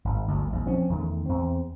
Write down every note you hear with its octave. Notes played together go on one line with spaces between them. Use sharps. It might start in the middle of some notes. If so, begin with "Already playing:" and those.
G#1
G1 D2
A#1 E2
F3 C4 C#4
E2 D#3 A3
E2 C4